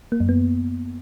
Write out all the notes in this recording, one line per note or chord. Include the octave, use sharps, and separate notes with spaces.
A#3
F#2
B3